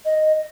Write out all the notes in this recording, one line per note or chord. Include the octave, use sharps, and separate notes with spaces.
D#5